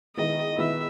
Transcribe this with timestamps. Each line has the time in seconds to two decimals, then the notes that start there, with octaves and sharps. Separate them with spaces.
0.16 D#3 G#3 B3 E4 D#5
0.57 D#3 G#3 B3 E4 E5